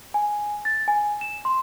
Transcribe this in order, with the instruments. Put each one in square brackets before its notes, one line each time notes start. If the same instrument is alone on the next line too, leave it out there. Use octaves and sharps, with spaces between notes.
[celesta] G#5
A6
G#5
E7
C6